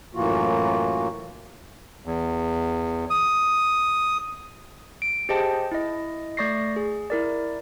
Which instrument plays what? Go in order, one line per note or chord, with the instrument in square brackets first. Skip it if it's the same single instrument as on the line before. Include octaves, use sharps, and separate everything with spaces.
[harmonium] F#2 A2 E3 A#3 F4 F#4
[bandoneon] E2
D#6
[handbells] D7
G4 G#4 C5 D#5 G5 A5
E4 D#5
A3 D5 C#6 A#6 C7
G#4
E4 A#4 D5